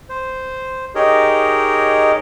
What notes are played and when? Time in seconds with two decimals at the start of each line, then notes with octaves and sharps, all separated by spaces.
0.09 C5
0.95 D#4 G4 G#4 A#4 C#5 D#5